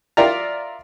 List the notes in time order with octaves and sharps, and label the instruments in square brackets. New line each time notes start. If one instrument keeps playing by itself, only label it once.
[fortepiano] F4 A#4 D5 E5 A#5